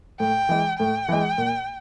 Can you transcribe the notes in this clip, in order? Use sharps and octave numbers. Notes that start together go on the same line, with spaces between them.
A2 G5
E3 G#3
A2 G5
E3 G#3
A#2